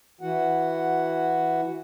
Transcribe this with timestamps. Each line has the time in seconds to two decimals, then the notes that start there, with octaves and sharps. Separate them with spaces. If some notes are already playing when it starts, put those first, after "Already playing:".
0.21 E3 F#4 F#5